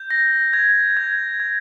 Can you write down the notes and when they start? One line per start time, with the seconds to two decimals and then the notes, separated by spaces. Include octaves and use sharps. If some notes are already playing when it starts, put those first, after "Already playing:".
Already playing: G6
0.11 A#6
0.53 G#6
0.97 G#6
1.40 G#6